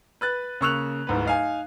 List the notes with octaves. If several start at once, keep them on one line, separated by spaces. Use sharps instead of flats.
B4 F#6 A6
C#3 A#3 C#6 E6 F#6 F7
D1 G#2 B4
D#4 F5 G#5